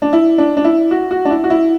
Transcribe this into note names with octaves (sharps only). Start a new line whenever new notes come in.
D4
E4
D4
D4
E4
F#4
F#4
D4
E4
F#4
E4